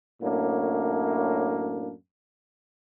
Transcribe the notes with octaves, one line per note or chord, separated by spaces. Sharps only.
F#2 A2 A#3 D4